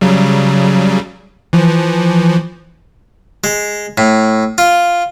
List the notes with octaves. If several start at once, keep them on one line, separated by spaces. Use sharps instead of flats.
C#3 F#3 G3
E3 F3
G#3
A2
F4